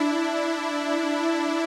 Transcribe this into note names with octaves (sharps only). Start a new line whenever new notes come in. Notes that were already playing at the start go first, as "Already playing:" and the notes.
Already playing: D4 E4